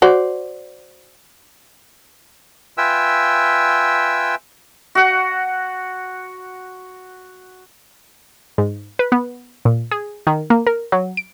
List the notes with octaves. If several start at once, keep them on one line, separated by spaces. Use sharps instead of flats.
F#4 C5 D5
F4 B4 E5 G5 G#5 E6
F#4 F#5
G#2
B4
B3
A#2
G#4
D#3
A#3
A#4
F#3
D7